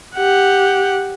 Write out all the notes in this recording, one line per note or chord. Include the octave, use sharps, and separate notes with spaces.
G4 F#5